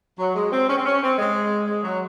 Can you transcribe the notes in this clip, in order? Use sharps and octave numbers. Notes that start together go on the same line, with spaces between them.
F#3
G#3
C4
C#4
C4
C#4
C4
G#3
G#3
F#3